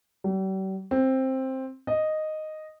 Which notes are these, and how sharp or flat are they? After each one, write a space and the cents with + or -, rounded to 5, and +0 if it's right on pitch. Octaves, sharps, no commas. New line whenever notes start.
G3 -45
C4 +10
D#5 -5